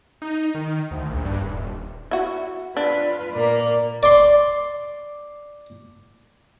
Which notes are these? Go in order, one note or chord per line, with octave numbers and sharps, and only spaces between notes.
D#4
D#3
D2
A#1
G2
D#1
E4 F#4
D4 F4 B4
A#2 A#3 D5
D5 C6